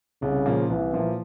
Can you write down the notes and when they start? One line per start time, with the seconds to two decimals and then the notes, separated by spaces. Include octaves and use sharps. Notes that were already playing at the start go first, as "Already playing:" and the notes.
0.22 C2 C#3
0.46 A#2 F3 A#3
0.69 C2 E3
0.93 A#2 F3 A#3